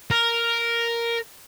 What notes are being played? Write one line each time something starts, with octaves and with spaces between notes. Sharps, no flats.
A#4